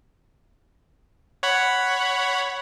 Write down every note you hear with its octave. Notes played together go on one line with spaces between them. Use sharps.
C#5 F#5 B5